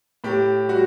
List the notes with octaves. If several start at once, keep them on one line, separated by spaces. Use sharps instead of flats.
A2 G4
G3 F#4